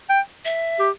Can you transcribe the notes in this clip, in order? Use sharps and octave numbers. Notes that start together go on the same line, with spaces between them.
G5
E5
G4